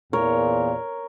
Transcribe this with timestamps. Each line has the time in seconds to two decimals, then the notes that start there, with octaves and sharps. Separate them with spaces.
0.13 E2 A#2 A#4 C#5